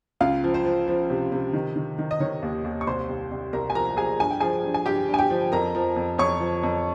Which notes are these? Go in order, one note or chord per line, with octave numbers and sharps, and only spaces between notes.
C#2 F4 F5
F3
C5
F3
F3
C3
C3
D#3
D#3
D#3
D#5
D#3 C#5
D#2
D#2
C#6
C2 C5 C6
C2
C2
C2 A#4 A#5
G#5
F3 A#4 A#5
F3 G#4 G#5
G2 G#5
G5
F3 G#4 G#5
G2
G#5
G2 G4 G5
G2
G#5
G4 G5
F3
F2 A#4 A#5
F3
F2
F2 C#5 C#6
F3
F2